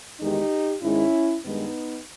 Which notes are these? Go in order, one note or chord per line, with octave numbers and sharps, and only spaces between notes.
E2 D#3 G#3 D#4 G4
G#2 D#3 G#3 C#4 E4
G2 D#3 G#3 B3 D#4